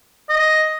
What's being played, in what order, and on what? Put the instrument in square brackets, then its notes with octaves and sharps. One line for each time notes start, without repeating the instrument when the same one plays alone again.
[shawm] D#5